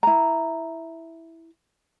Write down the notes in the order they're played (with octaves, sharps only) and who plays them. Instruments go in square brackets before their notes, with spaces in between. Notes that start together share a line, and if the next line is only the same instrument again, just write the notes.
[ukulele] E4 A#5